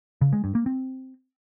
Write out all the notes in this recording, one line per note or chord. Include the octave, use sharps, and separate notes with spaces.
C#3
G#3
G2
A#3
C4